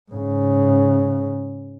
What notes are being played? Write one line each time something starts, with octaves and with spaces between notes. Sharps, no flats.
G#2 C#3